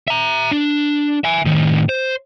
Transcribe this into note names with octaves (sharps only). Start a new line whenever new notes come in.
E5 A#5
D4
E5 G#5
A2 D#3
C5